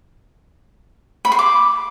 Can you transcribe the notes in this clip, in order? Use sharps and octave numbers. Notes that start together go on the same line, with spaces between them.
B5
C6
D6